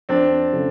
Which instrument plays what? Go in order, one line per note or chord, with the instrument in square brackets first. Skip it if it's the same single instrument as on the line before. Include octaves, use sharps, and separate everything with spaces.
[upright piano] F2 [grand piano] C4 D4
[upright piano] C#3 F3 A3